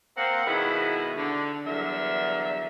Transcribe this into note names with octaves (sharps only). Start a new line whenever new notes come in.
A#3 C4 F#5
B2 D#3 G#3 B3 E4
D3
E2 G2 D3 F#3 A#4 E5